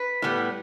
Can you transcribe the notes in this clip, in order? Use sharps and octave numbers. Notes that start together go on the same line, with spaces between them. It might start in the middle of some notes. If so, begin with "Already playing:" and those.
Already playing: B4
A2 G3 B3